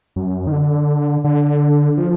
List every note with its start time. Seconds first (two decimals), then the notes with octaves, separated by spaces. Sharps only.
0.16 F#2
0.47 D#3
0.52 D3
1.24 D3
1.97 F3